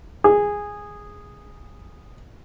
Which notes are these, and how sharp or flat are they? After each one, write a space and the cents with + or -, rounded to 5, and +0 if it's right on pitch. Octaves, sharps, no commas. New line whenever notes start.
G#4 -10